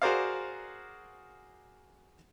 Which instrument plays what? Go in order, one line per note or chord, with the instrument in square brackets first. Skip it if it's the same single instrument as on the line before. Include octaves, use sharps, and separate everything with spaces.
[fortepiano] F#4 G#4 A#4 C5 D5 F5